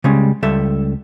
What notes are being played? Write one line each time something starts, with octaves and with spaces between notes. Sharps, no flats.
C#3 G3 G#3 C#4
C#2 G3 A4 E5